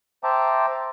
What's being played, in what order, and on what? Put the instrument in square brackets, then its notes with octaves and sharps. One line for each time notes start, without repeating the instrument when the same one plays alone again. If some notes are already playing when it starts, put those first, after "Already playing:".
[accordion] C5 E5 G5 A5 A#5 D6